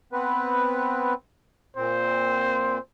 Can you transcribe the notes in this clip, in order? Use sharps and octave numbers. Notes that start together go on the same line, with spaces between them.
B3 C4 B4
A#2 C4 C5